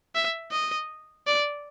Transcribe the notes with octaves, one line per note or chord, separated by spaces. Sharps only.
E5
D#5
D5